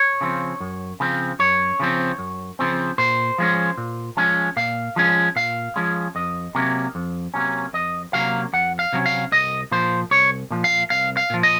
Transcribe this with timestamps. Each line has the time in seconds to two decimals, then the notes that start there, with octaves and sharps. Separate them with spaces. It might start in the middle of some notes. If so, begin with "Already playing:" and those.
Already playing: C#5
0.21 C#3 F3 C4
0.60 F#2
1.00 C#3 F3 C4
1.39 F#2 C#5
1.79 C#3 F3 C4
2.19 F#2
2.59 C#3 F3 C4
2.98 A#2 C5
3.38 F3 G#3 C#4
3.77 A#2
4.17 F3 G#3 C#4
4.56 A#2 F5
4.96 F3 G#3 C#4
5.36 A#2 F5
5.76 F3 G#3 C#4
6.15 F2 D#5
6.55 C3 F#3 A#3 C#4
6.95 F2
7.34 C3 F#3 A#3 C#4
7.73 F2 D#5
8.13 C3 F#3 A#3 C#4 F5
8.53 F2 F#5
8.79 F5
8.93 C3 F#3 A#3 C#4
9.06 F5
9.32 C2 D#5
9.71 A#2 F3 C5
10.11 C2 C#5
10.51 A#2 F3
10.64 F5
10.90 C2 F5
11.17 F5
11.30 A#2 F3
11.43 D#5